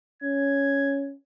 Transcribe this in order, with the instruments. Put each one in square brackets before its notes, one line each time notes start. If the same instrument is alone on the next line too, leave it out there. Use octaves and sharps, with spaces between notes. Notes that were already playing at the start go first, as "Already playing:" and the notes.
[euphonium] C#4 [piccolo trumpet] G#6